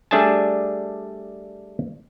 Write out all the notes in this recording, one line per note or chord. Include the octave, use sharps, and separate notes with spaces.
G3 A3 D4 G#4 G#5 A5